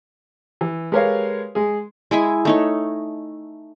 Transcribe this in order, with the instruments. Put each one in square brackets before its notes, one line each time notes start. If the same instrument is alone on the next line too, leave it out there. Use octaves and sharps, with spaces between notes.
[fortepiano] E3
G#3 G4 A#4 B4 C#5 F5
G#3 G#4
[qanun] G#3 E4 G#4 G#5
A3 D#4 C#5